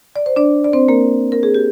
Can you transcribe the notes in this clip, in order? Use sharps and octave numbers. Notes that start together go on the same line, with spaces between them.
D5
C5
D4 D5
D5
C4 C5
A#3 A#4
A#4
G#4
G4